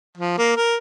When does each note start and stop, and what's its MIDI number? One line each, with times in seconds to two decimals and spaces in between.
0.18 0.37 53
0.38 0.56 58
0.56 0.76 70